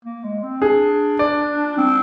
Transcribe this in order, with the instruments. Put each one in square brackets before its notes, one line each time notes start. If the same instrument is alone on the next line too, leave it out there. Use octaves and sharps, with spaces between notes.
[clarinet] A#3
G#3
C4
[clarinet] D4 [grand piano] G#4
[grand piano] D5
[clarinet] C4